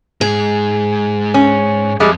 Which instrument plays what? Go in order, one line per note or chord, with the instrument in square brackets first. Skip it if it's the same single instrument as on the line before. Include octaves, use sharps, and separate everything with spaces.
[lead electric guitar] G#2 [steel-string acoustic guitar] G#4
[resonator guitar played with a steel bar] C#4
[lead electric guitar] F2 [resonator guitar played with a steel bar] G3 G#3